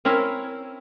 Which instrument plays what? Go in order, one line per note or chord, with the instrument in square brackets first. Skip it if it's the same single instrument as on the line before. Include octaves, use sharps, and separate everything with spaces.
[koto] C4 C#4 E4 A#4